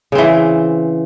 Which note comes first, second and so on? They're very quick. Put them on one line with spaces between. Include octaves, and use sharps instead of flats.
C#3 C4 E3